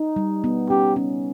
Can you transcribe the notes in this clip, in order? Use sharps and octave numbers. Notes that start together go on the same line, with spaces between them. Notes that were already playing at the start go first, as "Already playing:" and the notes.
Already playing: D#4
G3
B3
C#4 G4
C#4